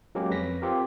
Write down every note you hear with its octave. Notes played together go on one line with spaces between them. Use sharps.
F#3 G#3 A#3 C#4 G4
F2 B4 C#5 A#6 B6
C4 F4 G4 A#4